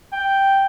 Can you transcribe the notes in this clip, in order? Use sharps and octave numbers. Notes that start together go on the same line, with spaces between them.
G5